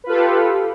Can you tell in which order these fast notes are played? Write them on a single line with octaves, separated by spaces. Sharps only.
B4 F4 A4 G4